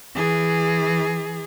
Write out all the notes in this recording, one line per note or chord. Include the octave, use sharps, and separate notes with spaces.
E3 G#4